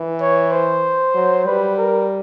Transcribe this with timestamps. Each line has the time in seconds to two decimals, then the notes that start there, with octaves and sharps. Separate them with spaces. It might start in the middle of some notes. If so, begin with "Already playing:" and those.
Already playing: E3
0.21 C#5
0.51 C5
1.15 F#3
1.46 G3 B4
1.78 A#4